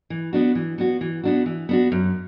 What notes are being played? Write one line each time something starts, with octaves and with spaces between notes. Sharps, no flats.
E3
B3 D4 F#4
E3
B3 D4 F#4
E3
B3 D4 F#4
E3
B3 D4 F#4
F#2